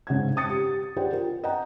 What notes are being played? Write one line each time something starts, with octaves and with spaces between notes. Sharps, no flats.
G#2 C#3 F#5 G#6
G5 D#6 A6 C#7
G4
G4 G#4 C5 D5 F#5 G5
F4 A#4
D#5 F#5 G5 A#5